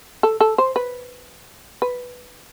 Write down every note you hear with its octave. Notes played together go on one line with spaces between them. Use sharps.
A4
A4
C5
B4
B4